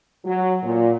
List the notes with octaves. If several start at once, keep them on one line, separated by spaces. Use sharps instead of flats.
F#3
A#2